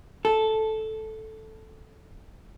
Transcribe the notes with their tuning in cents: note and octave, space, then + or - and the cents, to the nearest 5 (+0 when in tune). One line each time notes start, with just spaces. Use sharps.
A4 -5